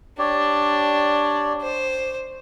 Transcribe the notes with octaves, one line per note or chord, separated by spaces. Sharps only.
D4 G4 C#5 D5
C5